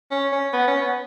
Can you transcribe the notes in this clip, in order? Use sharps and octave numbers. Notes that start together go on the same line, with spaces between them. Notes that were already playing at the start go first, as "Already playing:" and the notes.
C#4
C#4
B3
C#4
B3